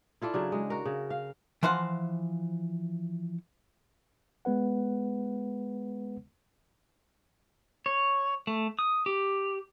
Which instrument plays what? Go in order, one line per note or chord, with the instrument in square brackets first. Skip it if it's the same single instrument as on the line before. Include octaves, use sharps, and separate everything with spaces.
[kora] E4 F4 A4 D5
C#3 F#3 D4
G#3
F#4 A#4
C#3
F5
[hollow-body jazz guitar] E3 F3 C5 F5 F#5
[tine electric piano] G#3 B3 B4 F#5
[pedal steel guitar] C#5
A3
D#6
G4